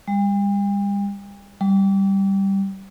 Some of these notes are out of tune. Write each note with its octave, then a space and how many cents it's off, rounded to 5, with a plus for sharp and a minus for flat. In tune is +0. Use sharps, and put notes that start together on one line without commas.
G3 +40
G3 -5